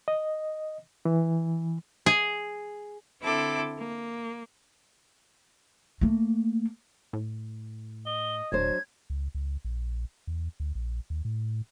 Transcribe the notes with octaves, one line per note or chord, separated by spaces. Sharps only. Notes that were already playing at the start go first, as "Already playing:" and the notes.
D#5
E3
G#4
D3 C4 E4 A4 D6
A#3
A3 A#3
A2
D#5 G7
D#1 F#3 D4 C5 G#6
C#2
C#2
A#1
E2
D2
A#1
D#2
A2